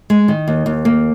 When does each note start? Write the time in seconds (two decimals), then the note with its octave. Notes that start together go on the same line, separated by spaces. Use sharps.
0.10 G#3
0.28 D#3
0.48 D#2
0.66 D#2
0.85 A#3